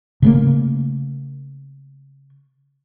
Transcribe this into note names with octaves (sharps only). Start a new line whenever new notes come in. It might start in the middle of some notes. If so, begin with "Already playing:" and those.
C#3 A3 A#3